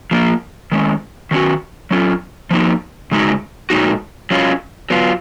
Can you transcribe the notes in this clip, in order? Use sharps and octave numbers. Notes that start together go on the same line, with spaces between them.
F3 A#3 F4
D#3 G#3 C#4
D#3 F#3 C#4 F#4
F#3 C#4 F4
F3 A#3 D#4
C#3 G#3 D#4 F#4
A#2 G#3 D#4 F#4
F#3 C#4 F4
F#3 B3 F4